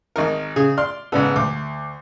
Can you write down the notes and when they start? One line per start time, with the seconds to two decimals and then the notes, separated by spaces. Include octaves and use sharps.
0.16 G#1 D#4 A#4
0.56 C#3 G#4 G#5
0.78 D5 C6 F6
1.12 G#2 C#3 B3 A4 D5
1.36 D2 D6